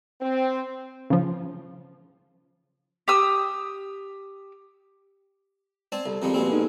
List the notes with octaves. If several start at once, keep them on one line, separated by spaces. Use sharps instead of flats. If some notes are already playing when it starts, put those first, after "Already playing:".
C4
C#3 F3
G4 D#6 E6
C4 D5 G#5 A5
C2 A4
F2 D#3 G3 G#3
B2 G3 A#3 C4 G#5
G#2 A4